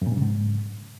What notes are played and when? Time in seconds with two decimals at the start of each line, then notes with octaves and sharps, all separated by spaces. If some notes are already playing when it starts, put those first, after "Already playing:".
0.02 F#2
0.07 A#2
0.12 G2
0.17 C#3
0.22 G#2